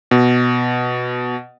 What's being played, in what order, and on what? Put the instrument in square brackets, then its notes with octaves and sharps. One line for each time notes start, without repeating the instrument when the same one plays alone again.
[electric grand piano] B2